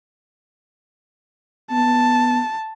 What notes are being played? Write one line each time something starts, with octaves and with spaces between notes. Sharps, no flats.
B3 A5